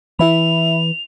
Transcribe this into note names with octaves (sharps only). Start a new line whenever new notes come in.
E3 E4 E5 B5 F7